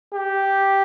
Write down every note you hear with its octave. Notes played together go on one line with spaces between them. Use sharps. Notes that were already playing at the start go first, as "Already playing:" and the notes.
G4